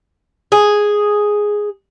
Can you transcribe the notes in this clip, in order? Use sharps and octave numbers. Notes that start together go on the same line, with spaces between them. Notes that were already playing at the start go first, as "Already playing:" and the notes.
G#4